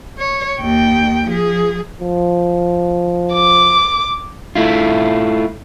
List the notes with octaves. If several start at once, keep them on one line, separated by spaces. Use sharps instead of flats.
C#5
D#2 G5
F3 G#4
F3
D6
A3 E4 F4